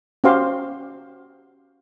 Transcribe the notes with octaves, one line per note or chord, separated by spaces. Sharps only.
C#4 F#4 G4 C5 F5 C6